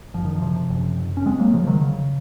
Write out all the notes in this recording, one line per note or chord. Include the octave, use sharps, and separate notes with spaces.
F#1 F3
D#3
F3
C3
F#1
F#1
C#4
F1 G#3 C4
F#3 A#3
C#3 F3 G#3
D#3 F#3
C#3